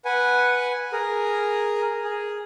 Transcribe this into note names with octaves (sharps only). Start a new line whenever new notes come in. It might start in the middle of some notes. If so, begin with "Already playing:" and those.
B4 F#5 G#5
G#4 A#4
G#4